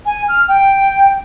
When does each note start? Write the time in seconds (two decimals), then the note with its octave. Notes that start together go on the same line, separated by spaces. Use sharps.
0.06 G#5
0.28 F6
0.48 G5